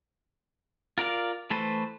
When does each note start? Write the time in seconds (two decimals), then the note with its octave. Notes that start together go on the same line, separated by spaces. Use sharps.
0.98 F4 A#4 D5 F5
1.50 E3 A3 A4 B4 C5